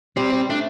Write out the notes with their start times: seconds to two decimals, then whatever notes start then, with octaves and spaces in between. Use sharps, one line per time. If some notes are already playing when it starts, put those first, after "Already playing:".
0.17 G3 C4
0.33 G3
0.49 A3 D4